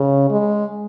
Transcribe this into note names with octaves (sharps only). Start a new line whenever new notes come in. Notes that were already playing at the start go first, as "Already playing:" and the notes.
Already playing: C#3
G#3